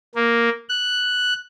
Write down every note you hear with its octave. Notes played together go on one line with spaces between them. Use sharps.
A#3
F#6